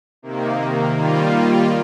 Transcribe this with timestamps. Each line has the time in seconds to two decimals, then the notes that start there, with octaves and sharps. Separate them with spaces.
0.22 C3 D#3 A#3
0.96 D#3 G3 A#3 F4